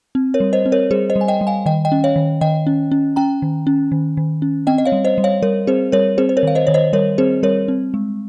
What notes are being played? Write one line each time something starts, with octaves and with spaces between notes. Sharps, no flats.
C4
A#4 C#5
G3
C5 D#5
C4
A#4 C#5
G3 G#4 C5
C5 D#5
G3
G#5
D#5 G5
G3
F5 G#5
D#3 D#5 G5
D#5 G5
C#4
C#5 F5
D#3
D#3 D#5 G5
C#4
C#4
C#4 G5 A#5
D#3
C#4
D#3
D#3
C#4
C4 D#5 G5
D#5
C#5 F5
G3
C5 D#5
G3
C#5 F5
G3 A#4 C#5
C4 G#4 C5
G3 A#4 C#5
C4 G#4 C5
C5
A#4 C#5
D#3 F5
C5 D#5
D#3 C#5
C5 D#5
G3 A#4 C#5
C4 G#4 C5
G3 A#4 C#5
C4
G#3